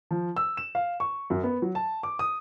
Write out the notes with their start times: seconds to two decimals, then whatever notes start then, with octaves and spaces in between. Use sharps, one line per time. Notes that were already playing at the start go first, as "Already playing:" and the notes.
0.11 F3
0.37 E6
0.57 E7
0.75 F5
1.00 C#6
1.30 F#2
1.44 B3
1.62 F#3
1.75 A5
2.03 D6
2.19 D#6